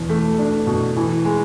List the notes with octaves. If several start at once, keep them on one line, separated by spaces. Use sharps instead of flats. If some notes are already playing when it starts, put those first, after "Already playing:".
Already playing: E2 B2
A3
D4
B2
E3
G#3